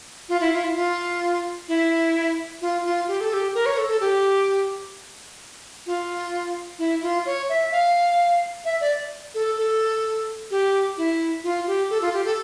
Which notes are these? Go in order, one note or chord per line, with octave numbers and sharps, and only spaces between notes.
F4
E4
F4
E4
F4
E4
F4
F4
G4
A4
G4
A#4
C#5
A4
A4
G4
F4
E4
F4
C#5
E5
F5
E5
D5
A4
A4
G4
E4
F4
G4
A4
F4
G4
A4